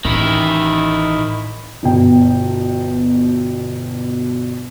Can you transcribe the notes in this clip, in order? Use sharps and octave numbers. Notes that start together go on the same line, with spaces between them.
A1 D#3 E4
G1 B2 G5